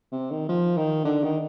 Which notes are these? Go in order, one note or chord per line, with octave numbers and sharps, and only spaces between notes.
C3
D#3
F3
D#3
D3
D#3